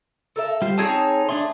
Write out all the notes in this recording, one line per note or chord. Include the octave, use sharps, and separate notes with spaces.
A4 A#4 E5
G3 F4 C5
C4 D#4 G#4 C#5 A5
A3 D4 G#4 C6